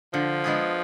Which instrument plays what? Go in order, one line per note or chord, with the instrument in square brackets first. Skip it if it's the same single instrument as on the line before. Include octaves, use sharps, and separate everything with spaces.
[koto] D3 [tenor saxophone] F3
[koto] G#3 B3 D4 G#4